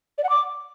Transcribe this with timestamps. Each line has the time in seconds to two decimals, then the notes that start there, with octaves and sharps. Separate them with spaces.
0.18 D5
0.24 F#5
0.29 D6